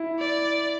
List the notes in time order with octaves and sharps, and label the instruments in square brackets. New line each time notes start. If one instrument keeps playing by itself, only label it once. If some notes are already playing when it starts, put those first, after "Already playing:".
Already playing: [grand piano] E4
[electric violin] D5